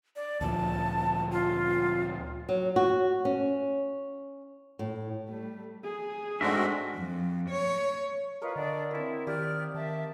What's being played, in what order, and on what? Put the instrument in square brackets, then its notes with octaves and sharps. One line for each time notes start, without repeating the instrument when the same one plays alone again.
[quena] D5
[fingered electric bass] D2 A#2 F3 [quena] A5
[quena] F4
[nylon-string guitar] F#3
F#4
C#4
A2
[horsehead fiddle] G3 A3
G#4
[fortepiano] G#2 A3 D4 [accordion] G#3 C4 F#4 [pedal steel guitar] A#4 E5
[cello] F2
C#5
[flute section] F4 B4 [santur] A#4 C#5 D#5
[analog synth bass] D3 [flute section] D4 D5 F#5
[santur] A#3 C4 [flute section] E4
[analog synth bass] D#3 [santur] G4 D#6 [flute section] D5 F6
[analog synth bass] D#3 [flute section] E5 A5